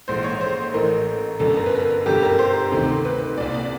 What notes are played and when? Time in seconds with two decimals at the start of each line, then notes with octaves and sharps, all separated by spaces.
0.08 A#1 G#2 E3 C5
0.24 C#5
0.41 C5
0.74 A1 A2 E3 A#4
1.39 G1 F#2 D3 A4
1.57 A#4
1.66 B4
1.75 A#4
2.06 G1 F#2 D3 G4
2.22 A#4
2.39 C5
2.72 D2 C3 D#3
3.05 B4
3.38 C2 A#2 D5
3.54 D5